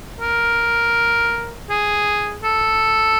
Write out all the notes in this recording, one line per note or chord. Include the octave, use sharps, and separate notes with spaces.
A#4
G#4
A4